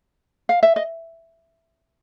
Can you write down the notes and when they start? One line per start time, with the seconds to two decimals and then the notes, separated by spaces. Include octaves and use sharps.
0.49 F5
0.63 E5
0.76 D#5